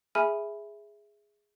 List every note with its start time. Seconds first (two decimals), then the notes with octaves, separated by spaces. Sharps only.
0.15 G#4 E5 G#5 B5 F6 D#7